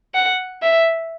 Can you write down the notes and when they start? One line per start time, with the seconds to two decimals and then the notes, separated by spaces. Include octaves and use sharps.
0.15 F#5
0.63 E5